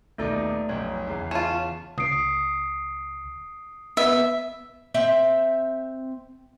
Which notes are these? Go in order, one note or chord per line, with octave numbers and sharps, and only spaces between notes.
D#1 B2 A3 D#4 A4 D5
F1 B1 C#4 C#5
E2 C#3
C#4 F4 A5
C#2 D#6 C7 D7
B3 E5
C4 E5 G5